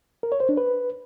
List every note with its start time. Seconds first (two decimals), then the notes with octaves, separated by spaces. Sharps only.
0.23 A#4
0.32 C#5
0.40 C5
0.49 D4
0.57 B4